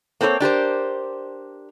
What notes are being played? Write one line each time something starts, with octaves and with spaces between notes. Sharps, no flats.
A#3 C4 A4 C5 C#5
D4 G4 A#4 C5